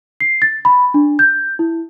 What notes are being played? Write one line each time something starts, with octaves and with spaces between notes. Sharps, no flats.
C7
A6
B5
D4
G6
E4